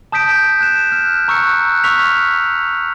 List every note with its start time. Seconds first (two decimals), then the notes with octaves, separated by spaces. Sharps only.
0.12 A5 D#6 G6 B6 D7
0.60 F#6 E7
0.92 F6
1.28 A#5 C#6 E6 F#6 C#7
1.84 C#6 E6 F6 B6 F7